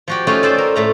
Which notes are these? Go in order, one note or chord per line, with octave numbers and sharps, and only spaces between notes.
F3 F#4 G4
A3 C#4 D#4 F4 F#4
A4 C5 D5 G5 A5
A#4
A2 A3 A#5